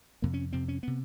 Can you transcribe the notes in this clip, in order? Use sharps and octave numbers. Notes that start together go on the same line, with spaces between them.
F2 C3 A#3
C#4
F2 C3 C4
C#4
C3 B3